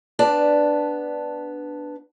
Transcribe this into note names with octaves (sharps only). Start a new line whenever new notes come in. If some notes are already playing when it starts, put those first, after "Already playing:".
B3 D4 D5 A5